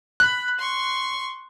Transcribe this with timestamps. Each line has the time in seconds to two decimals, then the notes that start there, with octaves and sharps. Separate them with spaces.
0.20 B5 F#6
0.59 C6 C#6